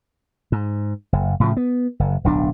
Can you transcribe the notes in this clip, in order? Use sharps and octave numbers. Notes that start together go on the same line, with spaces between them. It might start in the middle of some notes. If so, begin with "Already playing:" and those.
G#2
F#1
A2 C#3 F3
B3
F#1
D1 B1 D4